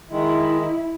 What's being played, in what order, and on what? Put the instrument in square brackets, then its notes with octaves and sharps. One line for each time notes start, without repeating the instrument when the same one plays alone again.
[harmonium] D#3 G#3 [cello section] E4